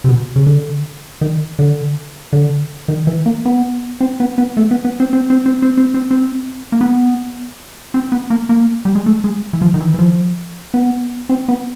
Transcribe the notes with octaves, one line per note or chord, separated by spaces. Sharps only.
C3
B2
C#3
D3
D#3
D3
D3
D#3
E3
A#3
B3
C4
B3
B3
A3
B3
B3
C4
C4
C4
C4
C4
C4
C4
C4
A#3
B3
C4
B3
A#3
A#3
G3
G#3
A3
G#3
E3
F3
D#3
E3
E3
F3
B3
C4
B3